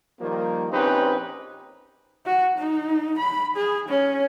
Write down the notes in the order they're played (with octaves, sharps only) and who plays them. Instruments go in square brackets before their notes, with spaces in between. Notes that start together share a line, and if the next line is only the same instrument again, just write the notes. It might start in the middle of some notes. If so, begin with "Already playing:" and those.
[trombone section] D#3 F3 G3 A#3
A#1 C4 C#4 D#4 G4 B4
[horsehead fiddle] F#4
D#4
B5
G#4
C#4